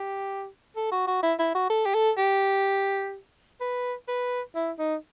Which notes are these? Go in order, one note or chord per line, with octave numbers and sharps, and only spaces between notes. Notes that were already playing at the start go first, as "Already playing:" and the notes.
Already playing: G4
A4
F#4
F#4
E4
E4
F#4
A4
G4
A4
G4
B4
B4
E4
D#4